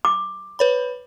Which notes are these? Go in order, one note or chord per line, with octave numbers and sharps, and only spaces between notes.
D6
B4 C#5 B5